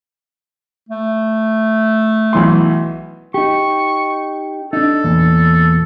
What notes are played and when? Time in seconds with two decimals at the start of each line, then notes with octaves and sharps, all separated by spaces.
0.89 A3
2.33 B1 E3 C6
3.34 D#4 G4 C#6
4.73 D4 D#4 A4
5.04 E2 A#2